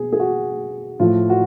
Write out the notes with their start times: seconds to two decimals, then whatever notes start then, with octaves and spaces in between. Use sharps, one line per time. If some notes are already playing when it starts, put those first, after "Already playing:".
Already playing: B2 G#4
0.13 G#4
0.20 F#4
1.00 A2 F3 F4
1.30 F#4